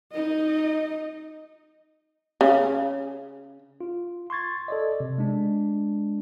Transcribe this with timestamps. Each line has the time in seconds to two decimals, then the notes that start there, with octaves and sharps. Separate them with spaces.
0.12 D#4 D#5
2.41 C#3
3.81 F4
4.30 C6 C#6 G#6 A6
4.68 A4 D5 D#5
5.00 C3
5.18 G#3 D4